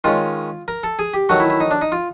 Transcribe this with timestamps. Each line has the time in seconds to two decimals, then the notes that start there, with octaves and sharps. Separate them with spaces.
0.04 D#3 G#3 C#4 F4
0.68 A#4
0.83 A4
0.99 G#4
1.14 G4
1.29 D#3 F#3 A3 F#4
1.40 E4
1.50 E4
1.60 D#4
1.71 D4
1.82 D#4
1.92 F4